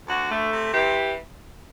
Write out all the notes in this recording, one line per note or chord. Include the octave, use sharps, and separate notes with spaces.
D2 F#4
A3
C3
E3 G4